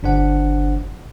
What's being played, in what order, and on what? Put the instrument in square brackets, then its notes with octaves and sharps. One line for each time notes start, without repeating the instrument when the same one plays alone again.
[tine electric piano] G1 D4 C5 F#5